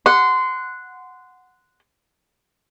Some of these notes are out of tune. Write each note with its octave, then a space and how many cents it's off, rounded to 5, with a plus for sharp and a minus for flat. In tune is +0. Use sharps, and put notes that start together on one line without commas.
F#5 -5 C6 -20